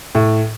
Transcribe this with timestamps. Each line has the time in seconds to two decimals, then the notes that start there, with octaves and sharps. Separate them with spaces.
0.15 A2